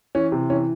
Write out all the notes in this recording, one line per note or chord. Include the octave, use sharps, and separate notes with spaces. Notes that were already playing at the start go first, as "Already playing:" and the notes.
E3 C#4
C3
E3 C#4